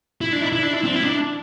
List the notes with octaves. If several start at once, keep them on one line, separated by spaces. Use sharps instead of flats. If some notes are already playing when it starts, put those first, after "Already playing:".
E4
D4
E4
E4
D4
E4
C4
E4
D4